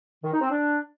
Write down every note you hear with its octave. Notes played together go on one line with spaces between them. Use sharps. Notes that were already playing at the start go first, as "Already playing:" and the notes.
D#3
D#4
C4
D4